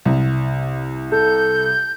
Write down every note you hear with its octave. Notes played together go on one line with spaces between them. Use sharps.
C2
A4 G6